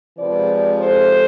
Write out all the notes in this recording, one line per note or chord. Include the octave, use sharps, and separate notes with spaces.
C3 F3 G#3 B4 D5
A4 C5